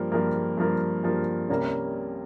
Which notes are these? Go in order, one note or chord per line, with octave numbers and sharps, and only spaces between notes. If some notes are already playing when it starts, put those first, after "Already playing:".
Already playing: G2 F3 A#3
G2 F3 A#3
G2 F3 A#3
G2 F3 A#3
C2 C3 G3 A#3 C#4